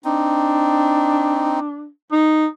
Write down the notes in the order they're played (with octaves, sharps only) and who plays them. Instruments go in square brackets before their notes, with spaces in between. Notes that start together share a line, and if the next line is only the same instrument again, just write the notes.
[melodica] C4 D#4 [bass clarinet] D4
[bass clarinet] D#4